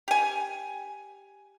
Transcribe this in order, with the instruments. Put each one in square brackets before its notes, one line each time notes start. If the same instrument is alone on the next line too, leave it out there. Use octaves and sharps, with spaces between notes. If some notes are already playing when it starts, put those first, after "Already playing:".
[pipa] G4 G#5